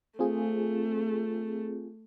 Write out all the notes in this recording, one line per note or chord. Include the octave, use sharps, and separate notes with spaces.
A3 C4 F4 G#4